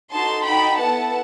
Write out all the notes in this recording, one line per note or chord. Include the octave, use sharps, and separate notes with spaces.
D#4 F#4 A4 A5 C6
D#4 F#4 A4 G5 B5
B3 E4 A4 F#5 A5